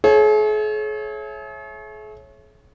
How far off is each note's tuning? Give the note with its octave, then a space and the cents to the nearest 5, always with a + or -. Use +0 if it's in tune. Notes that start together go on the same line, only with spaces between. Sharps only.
G#4 +45 C#5 -20 E5 +5